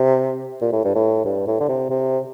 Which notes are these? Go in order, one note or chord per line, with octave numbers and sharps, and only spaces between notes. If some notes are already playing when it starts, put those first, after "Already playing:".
Already playing: C3
A#2
A2
G2
A2
G2
A2
D3
C3
C3